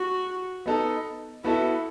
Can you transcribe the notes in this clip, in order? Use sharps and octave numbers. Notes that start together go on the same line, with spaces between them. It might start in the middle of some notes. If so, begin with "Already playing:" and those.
Already playing: F#4
B3 D#4 A4
B3 E4 F#4 A4 E5